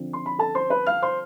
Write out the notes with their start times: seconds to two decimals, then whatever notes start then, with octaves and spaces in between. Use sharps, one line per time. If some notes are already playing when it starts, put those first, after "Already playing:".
Already playing: D3 F3 C4
0.13 C6
0.26 B5
0.39 A4 A5
0.55 C5 C6
0.70 B4 B5
0.87 F5 F6
1.02 C5 C6